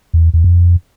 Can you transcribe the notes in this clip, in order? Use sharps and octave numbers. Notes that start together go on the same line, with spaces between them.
E2
E2
F2